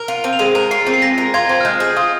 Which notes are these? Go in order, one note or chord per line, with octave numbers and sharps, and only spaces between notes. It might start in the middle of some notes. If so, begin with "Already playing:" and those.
Already playing: A#4
F4
C4
F7
G#3 D#7
A#4
F4 C7
C4
C7
G#3 A#6
A#4
F4 G#6
C4
F6
G#3 G6
G#4
F4 D#6